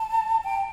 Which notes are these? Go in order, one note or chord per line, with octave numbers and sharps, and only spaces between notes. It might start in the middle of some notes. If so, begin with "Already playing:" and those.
Already playing: A5
G5